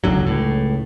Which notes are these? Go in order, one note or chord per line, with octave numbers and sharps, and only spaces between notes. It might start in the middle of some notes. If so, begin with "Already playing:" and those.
F#1 C#2 D3 F#3
C#2 A2